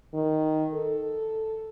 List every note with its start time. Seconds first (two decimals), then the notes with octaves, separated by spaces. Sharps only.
0.14 D#3
0.74 A4